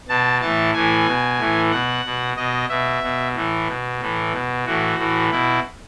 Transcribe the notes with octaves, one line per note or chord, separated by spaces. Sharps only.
B2 A5
A2 E3 A5
A2 E3 G#5
B2
A2 E3
B2 F#5
B2
B2 D#5
B2 E5
B2
A2 E3
B2
A2 E3
B2
A2 E3 F#4
A2 E3
B2 E4